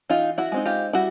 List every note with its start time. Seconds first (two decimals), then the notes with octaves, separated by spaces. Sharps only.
0.09 E3 D#4 F4
0.38 E4 F#4
0.52 G#3 C4 D#4
0.66 F4 G4
0.93 G3 E4 F#4